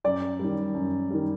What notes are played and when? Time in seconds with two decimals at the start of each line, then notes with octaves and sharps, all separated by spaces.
0.04 F#2 D5
0.40 D#3 G3
0.75 F#2
1.10 D#3 G3